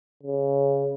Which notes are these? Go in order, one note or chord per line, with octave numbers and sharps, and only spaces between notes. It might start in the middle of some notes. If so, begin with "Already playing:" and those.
C#3